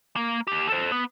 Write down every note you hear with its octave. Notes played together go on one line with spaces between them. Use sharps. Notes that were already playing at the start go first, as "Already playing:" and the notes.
A#3
D#2 G4
A4 C5
B3